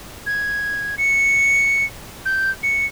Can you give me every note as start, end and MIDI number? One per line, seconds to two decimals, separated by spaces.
0.26 0.95 92
0.98 1.84 97
2.25 2.51 91
2.63 2.86 97